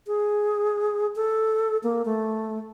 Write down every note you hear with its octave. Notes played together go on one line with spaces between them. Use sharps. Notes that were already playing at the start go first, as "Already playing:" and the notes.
G#4
A4
A#3
A3